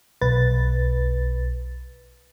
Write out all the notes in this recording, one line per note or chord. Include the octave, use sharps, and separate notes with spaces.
B1 B4 A6